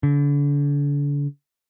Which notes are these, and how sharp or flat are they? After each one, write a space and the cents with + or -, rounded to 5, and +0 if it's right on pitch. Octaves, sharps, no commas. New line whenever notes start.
D3 -40